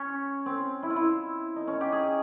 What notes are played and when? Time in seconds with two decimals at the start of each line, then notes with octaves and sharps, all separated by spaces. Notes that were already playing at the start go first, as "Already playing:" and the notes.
Already playing: C#4
0.46 C4
0.83 E4
0.90 F4
0.96 E4
1.56 D#4
1.67 C#4
1.81 G4
1.92 G#4